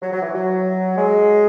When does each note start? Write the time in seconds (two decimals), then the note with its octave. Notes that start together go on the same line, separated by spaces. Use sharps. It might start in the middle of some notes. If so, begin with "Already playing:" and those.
0.01 F#3
0.12 F#3
0.22 E3
0.34 F#3
0.97 G#3